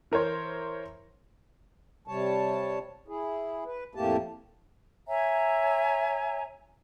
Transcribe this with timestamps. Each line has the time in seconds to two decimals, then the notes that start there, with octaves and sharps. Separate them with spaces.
0.12 E3 A#4 C5 C#5
2.07 C3 G3 C#5 A5
3.08 E4 G#4
3.66 B4
3.95 F2 A2 A3 A#3 G4 A5
5.08 C#5 E5 G#5 A#5